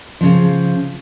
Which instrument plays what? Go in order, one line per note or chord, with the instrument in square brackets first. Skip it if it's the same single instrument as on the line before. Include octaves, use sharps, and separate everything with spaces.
[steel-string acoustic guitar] C#3 F3